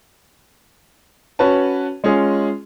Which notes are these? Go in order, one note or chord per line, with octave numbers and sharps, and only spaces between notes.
C#4 F#4 B4 C#5 A5
G#3 C#4 F4 G#4